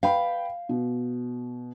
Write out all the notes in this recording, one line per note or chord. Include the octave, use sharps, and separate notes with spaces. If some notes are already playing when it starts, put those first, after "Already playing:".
B4 F5 G5 B5
B2